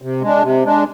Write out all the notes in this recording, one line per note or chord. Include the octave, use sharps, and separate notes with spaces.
C3
G#3 D4
C3
G#3 D4